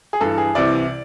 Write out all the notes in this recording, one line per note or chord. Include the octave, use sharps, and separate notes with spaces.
G#4
G2 E3 A4
G#4
C2 C3 E3 D5